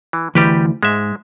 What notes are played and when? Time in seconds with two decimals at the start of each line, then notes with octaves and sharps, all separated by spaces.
0.13 E3
0.35 D2 E3 G3 G4 B4
0.83 G#2 G#3 E5